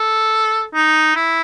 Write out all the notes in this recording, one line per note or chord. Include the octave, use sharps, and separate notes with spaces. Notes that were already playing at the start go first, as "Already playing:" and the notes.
Already playing: A4
D#4
E4